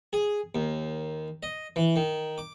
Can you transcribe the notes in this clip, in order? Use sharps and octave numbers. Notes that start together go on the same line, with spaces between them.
G#4
D#2
D#5
E3
D#3
D6